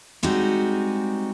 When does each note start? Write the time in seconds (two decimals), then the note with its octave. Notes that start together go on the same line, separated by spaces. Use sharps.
0.23 G3 G#3 C4 D#4 F#4